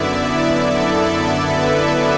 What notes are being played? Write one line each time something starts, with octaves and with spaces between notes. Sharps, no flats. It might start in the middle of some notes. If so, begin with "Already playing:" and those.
Already playing: F#2 D3 B3 E4 D5 E5
D5
A4
B4